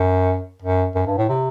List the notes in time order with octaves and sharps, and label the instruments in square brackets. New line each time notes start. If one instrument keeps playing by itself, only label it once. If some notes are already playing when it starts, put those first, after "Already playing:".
Already playing: [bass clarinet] F#2
F#2
F#2
G2
A2
C3